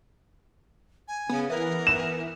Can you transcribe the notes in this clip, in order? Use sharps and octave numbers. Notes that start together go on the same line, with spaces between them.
G#5
C#3 B3
E3 B3 A#4
E7